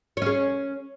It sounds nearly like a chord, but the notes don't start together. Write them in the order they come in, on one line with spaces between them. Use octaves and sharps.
C#5 C#4 G#4